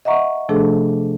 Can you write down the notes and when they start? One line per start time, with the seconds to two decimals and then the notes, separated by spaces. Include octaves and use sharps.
0.05 D#5 E5 F#5 A#5 C#6
0.49 C3 F3 A3 D4 G#4 A4